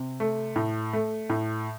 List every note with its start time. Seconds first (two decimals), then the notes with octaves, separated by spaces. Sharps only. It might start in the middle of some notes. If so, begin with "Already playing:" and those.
Already playing: C3
0.20 A3
0.56 A2
0.93 A3
1.30 A2